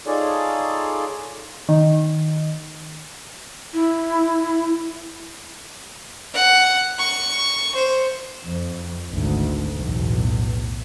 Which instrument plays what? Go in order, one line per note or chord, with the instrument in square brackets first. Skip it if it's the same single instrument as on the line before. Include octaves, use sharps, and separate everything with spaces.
[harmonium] D#4 F4 G#4 A4 C#5 D5
[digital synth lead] D#3
[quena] E4
[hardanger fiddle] F#5
C#6
C5
[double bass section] F2
G#1 D2
B1 E2 A2